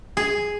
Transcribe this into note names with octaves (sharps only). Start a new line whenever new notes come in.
G#4